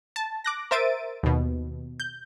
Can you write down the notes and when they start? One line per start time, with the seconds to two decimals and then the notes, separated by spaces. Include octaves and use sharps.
0.16 A5
0.44 D6 F#6 A#6
0.71 A#4 C5 E5 A6 D7 D#7
1.23 D#2 B2
2.00 G6